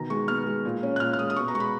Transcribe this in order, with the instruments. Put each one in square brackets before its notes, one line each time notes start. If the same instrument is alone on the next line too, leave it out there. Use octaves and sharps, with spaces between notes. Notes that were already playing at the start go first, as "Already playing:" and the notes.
Already playing: [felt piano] B2 D#3 A#5
G#3 C#6
B3 F6
G#3
A#2
C#4
F#6
A#2 F6
F6
G#3 D#6
D#6
B2 C#6
A#5
G#3 C#6
B5